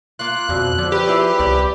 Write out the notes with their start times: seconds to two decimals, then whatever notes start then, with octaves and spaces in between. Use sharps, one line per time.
0.19 A#3 F4 F#6
0.49 F2 B2 D3
0.78 D3 F3
0.92 G4 B4
1.06 E4 G#4 D5
1.40 C2 D5